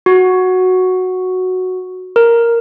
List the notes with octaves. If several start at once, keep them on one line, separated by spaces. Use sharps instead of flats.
F#4
A#4